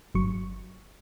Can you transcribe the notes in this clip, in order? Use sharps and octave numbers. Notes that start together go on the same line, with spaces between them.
G1 F#3 C#6